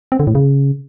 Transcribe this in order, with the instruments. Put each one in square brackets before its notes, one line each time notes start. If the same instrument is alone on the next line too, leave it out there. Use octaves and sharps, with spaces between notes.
[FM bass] C4
D3
A2
C#3